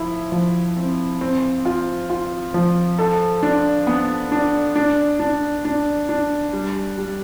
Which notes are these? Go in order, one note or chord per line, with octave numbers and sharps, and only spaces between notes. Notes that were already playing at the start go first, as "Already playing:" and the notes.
Already playing: F3 E4
F3
C4
C4
F4
F4
F3
A4
D4
B3
D4
D4
D4
D4
D4
G3
G3